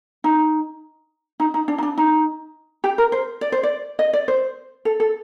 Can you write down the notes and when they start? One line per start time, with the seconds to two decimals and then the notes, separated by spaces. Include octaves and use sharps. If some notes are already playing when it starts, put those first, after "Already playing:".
0.24 D#4
1.40 D#4
1.54 D#4
1.68 D4
1.78 D#4
1.83 D4
1.98 D#4
2.84 G4
2.98 A#4
3.12 C5
3.41 D5
3.52 C5
3.63 D5
3.99 D#5
4.13 D5
4.28 C5
4.85 A4
5.00 A4